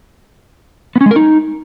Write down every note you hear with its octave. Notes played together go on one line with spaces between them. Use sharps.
B3
C#4
G#3
A#4
D#4